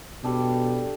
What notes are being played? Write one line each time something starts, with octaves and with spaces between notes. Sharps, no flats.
B2 G3 D4 A4